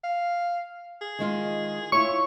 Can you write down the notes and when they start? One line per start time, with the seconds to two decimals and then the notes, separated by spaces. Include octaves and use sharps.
0.04 F5
1.02 G#4
1.19 D#3 G#3 F4
1.92 E4 F4 C#5 C#6